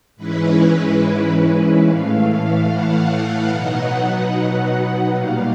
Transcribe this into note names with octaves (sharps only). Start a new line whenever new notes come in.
G#2 E3 G#3 C#4 E4 B4
A2 E3 A3 F5
F#5
B2 F#3 B3 D#4
A#2 G3 A#3 F5